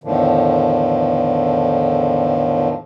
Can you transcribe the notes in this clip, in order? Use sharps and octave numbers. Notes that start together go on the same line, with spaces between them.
E2 A2 D3 D#3 F3